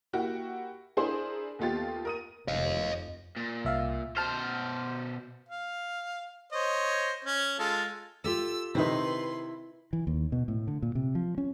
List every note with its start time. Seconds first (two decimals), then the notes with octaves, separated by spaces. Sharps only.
0.13 A#3 E4 F#4 G4
0.97 D4 E4 G#4 A#4 C5 C6
1.59 D#2 A3 B3 F4 G4 A6
2.05 A#4 D#6 D#7
2.48 F1 D#5 F5
3.36 A#2
3.64 C2 E5 F5
4.17 B2 C5 A5 F6
5.49 F5
6.52 C5 C#5 D#5
7.24 C#4
7.59 G#3 F4 A4
8.24 F4 G4 A4 E6
8.75 C3 D#3 D#4 E4 B4 C6
9.93 E3
10.07 D#2
10.32 B2
10.48 A2
10.67 D3
10.82 A#2
10.95 C3
11.15 F3
11.38 C#4